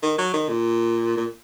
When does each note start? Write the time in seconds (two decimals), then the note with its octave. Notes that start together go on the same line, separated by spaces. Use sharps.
0.03 D#3
0.18 F#3
0.34 D#3
0.49 A#2
1.17 A#2